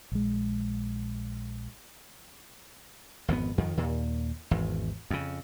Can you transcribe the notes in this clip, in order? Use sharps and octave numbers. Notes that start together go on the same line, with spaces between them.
A#1 G#3
G#1 F2 D#3 B3
F2 D#3
D#2 A#2
G#1 E2
F2 C#3